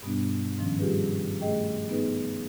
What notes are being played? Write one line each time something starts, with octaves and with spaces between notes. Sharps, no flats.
G2 B2 G3 B3 D4
G#2 D#3 F3 C#4
G3 F4 G4 G#4 B4
A3 G#4 D#5 G5
B3 D#4 G#4 B4